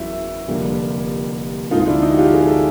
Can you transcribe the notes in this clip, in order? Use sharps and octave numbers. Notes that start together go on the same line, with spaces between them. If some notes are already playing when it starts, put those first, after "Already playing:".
Already playing: F#1 E2 C#3 E4 F#4
F1 F2 D3 G3 A#3
D2 C3 F3 G#3 D#4 F4
F4
D4 E4
D#4
F#4
F4 G4
G#4
A4